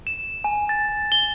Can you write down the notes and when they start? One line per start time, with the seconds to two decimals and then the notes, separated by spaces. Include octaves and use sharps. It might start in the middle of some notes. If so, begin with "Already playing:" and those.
0.07 E7
0.44 G#5
0.69 A6
1.12 G7